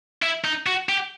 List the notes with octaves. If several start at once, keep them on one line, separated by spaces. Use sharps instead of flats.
E4
D#4
F#4
G4